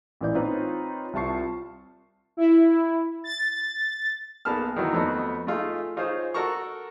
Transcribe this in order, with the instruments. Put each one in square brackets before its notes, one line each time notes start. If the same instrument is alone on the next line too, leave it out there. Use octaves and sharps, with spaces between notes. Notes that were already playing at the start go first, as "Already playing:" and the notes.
[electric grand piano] A1 A#2 E3 D5 G6
C4 D#4 F4 B4 C#5
C2 C3 F4 A5 C#6 C7
[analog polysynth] E4
A6
[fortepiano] B1 A#3 B3 G#4 A5 F6
D#3 E3 F#3
F2 A3 B3 D#4 F#4
A3 D#4 F4 G#4
D#4 F4 G#4 C5 C#5 D#6
F#4 A4 A#4 A5 A#5 C#6